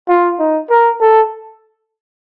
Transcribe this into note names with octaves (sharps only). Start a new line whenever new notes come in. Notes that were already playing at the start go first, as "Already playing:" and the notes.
F4
D#4
A#4
A4